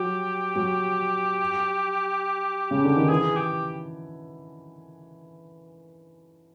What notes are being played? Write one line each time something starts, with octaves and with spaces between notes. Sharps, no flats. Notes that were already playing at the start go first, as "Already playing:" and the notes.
Already playing: F#3 G4
F#3
C#3
D3
D#3
E3 G#4
G4